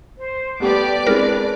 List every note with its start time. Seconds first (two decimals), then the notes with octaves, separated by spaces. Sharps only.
0.18 C5
0.60 G3 A3 B3 G4 B4 D5 D6
1.07 G#3 C4 D4 E4 A#4